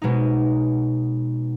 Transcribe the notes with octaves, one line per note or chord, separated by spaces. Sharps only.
B2 G#3 D#4